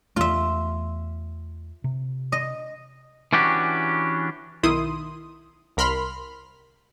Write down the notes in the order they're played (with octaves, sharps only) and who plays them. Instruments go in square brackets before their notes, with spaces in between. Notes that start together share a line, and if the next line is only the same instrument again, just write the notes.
[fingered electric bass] E2 A3 [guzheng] F4 E5
[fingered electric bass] C3
[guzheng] D#5
[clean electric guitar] E3 C#4 D4 F#4 G4
[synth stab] B1 D#3 E4 C6 D#6
C2 A#4 B5 C6 F6